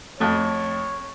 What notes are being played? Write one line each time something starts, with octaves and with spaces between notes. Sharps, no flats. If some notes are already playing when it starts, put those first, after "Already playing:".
F2 A3 C#5